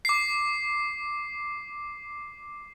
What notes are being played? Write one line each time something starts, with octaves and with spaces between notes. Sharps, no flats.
D6 C7